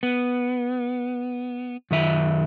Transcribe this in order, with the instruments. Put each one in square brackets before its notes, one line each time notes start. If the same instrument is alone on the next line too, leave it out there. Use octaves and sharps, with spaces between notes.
[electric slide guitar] B3
F#2 D#3 E5